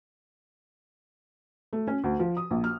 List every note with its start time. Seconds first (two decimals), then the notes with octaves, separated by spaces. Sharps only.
1.73 A3
1.87 C#4
2.04 D2
2.19 F3
2.37 D#6
2.51 A#1
2.64 F6